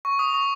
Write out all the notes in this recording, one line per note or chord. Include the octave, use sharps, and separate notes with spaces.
C#6
D#6
C#6